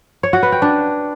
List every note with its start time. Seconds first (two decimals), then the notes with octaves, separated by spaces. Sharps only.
0.23 C#5
0.33 F#4
0.43 B4
0.52 G5
0.62 D4